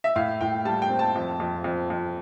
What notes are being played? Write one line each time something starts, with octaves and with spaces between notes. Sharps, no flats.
E5
A2 F5
A2 G5
G3 A5
G5
C4
A5
F2
F2
F2
F2